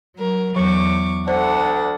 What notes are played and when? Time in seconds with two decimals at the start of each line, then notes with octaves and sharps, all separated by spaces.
0.15 F#3 A#4
0.56 E2 F#3 C#6 D6
1.28 D2 D4 A4 C5 F#5